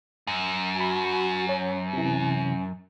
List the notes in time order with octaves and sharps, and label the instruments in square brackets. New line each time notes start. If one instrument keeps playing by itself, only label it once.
[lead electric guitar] F#2
[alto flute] F#4 [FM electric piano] G#5 B5
[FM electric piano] C#4 [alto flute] C#5
[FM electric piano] C3 E3 [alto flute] C#4